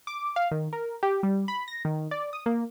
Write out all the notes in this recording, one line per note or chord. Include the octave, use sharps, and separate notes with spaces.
D6
F5
D#3
A#4
G4
G3
B5
A#6
D#3
D5
D#6
A#3